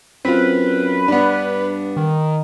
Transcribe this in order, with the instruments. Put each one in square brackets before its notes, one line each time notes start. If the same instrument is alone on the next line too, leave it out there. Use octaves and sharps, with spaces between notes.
[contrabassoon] F#2 [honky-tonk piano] C4 F4 [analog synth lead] B4
[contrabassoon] G2 [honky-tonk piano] B3 D4
[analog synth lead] D#3